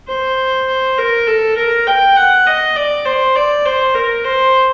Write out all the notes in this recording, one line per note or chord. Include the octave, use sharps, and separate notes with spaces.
C5
A#4
A4
A#4
G5
F#5
D#5
D5
C5
D5
C5
A#4
C5